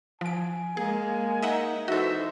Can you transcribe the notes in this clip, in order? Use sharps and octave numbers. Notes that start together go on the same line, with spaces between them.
F3 G#5 D7
G#3 A#3 G#4
D#4 D#5 E5 F#5
E3 D#4 F#4 A4 C5 E5